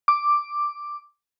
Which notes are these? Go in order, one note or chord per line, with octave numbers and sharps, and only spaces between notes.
D6